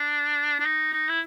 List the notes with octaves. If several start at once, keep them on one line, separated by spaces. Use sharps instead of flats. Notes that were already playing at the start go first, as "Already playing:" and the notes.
Already playing: D4
D4
D#4
D#4
E4